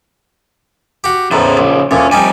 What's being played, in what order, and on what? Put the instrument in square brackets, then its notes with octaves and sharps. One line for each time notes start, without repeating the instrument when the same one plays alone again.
[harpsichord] F#4 G4
[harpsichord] E2 A2 [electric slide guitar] C#3 C5 A#5
[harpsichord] A#1
[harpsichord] D2 A#2 [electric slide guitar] C#4
[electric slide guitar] F2 G5 G#5 [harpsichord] G3 C#4 D#4